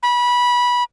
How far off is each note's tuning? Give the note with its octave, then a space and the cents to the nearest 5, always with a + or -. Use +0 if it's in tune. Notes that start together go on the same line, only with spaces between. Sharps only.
B5 -20